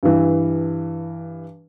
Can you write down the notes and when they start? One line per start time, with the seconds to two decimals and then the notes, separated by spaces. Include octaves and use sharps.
0.03 G2 E3